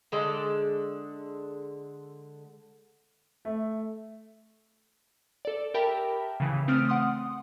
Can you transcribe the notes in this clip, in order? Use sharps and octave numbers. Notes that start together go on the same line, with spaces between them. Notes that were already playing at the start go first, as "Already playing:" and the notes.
D3 G#3 A4 D5
A3
A4 D5
G4 A#4 E5 G5 A5 B5
C#3 E3
A3 C4 D#6 F6 D7
F#5 C6 D#6